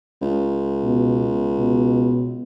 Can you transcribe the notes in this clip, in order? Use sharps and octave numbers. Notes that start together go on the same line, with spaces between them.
C#2
B2
B2